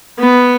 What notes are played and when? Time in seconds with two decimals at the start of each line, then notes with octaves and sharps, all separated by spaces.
0.20 B3